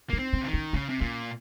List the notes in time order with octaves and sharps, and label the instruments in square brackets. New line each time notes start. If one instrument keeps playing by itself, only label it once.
[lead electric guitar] A#3 [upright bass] D#4
[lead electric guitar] C4
[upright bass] C#4
[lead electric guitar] C#3
D#3
[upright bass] C#4
[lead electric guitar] C#3 [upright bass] C#4
[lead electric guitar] C3
[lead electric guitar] A#2 [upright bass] C#4